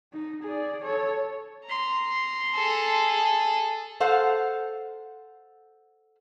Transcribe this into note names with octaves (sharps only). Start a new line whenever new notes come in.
D#4
G#4 D5
A4 C#5
A#5 C6
G#4 A4
A4 C5 F5 F#5